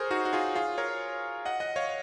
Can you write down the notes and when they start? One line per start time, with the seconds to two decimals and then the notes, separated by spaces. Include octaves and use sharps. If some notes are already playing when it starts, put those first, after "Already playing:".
Already playing: G#4 A#4 C5 C#5
0.11 D#4 F#4
0.25 F#4
0.33 F4 G#4
0.55 F4 G#4
0.78 A#4 C#5
1.45 D#5 F#5
1.60 D#5 F#5
1.76 C#5 F5